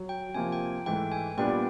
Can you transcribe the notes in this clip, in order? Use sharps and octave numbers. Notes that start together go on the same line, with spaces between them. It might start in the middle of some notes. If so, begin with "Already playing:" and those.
Already playing: F#3
G5
C3 F3 A#3 G#5
G5
G#2 E3 A3 G5
G#5
A#2 G3 B3 D4 G5